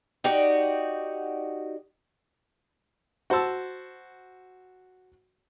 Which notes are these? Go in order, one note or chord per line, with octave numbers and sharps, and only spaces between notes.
D#4 F#4 G4 D5
F#4 C5 F#5 A5 E6